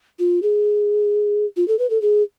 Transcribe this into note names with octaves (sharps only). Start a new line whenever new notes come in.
F4
G#4
F4
A4
B4
A4
G#4